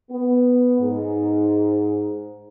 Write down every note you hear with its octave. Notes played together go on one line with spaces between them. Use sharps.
B3
G#2